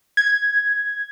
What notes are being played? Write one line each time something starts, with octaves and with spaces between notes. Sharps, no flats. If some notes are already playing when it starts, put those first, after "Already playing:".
G#6